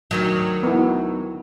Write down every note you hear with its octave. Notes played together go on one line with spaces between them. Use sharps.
D2 D#3 F#3
B3 E4